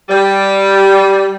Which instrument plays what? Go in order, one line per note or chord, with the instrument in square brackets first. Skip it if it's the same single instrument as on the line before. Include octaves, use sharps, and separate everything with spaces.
[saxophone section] G3